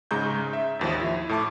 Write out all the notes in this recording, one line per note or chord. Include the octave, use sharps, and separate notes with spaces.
G#2 C#3 G#3 A#5 C#6 G6
E5
A1 D#2 F3
E4
A2 A3 A5 D6